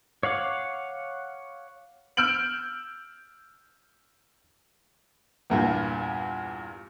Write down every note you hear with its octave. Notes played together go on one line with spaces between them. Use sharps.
C#5 F5 F#5 D6
E6 F6 G6 D7 F#7
E2 G2 A#2